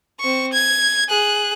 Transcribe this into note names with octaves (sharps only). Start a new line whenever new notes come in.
C4 C#6
G#6
G#4 F#6